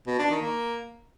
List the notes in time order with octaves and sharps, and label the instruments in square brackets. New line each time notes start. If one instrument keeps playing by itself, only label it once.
[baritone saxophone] B2
D4
D#3
A#3